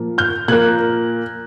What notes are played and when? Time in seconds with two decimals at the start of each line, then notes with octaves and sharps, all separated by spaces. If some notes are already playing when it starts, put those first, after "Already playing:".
Already playing: A#2 F3 A#3
0.18 F6 G6
0.48 A#2 F3 A#3 F#6 G#6